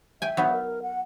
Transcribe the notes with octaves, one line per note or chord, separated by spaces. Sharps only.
E5 G5 G#5
F#3 B3 D#4
A#4
F#5